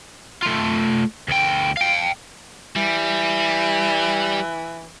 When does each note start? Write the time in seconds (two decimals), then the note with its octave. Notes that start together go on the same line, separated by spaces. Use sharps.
0.42 A3 F4
1.28 D2 G5
1.77 F5 G5
2.76 E3 G3